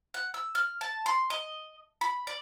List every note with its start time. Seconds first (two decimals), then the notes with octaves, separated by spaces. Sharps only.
0.14 F#5
0.34 E6
0.55 F6
0.81 A5
1.06 C6
1.30 D#5
2.01 B5
2.27 D5